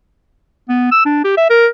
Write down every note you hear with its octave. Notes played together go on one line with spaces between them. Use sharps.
B3
E6
D4
G4
E5
A#4